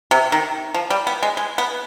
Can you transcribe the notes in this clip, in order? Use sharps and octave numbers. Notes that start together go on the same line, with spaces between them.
C3
D#3
F3
G3
B3
G#3
G#3
B3